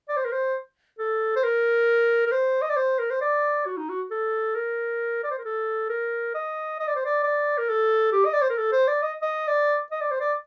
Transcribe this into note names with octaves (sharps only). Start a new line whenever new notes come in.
D5
C5
A#4
C5
A4
C5
A#4
A#4
C5
D#5
D5
C5
A#4
C5
D5
F#4
D#4
F#4
A4
A#4
D5
C5
A#4
A4
A#4
D#5
D#5
D5
C5
D5
D5
A#4
A4
G4
D#5
D5
C5
A#4
A4
C5
D5
D#5
D#5
D5
D#5
D5
C5
D5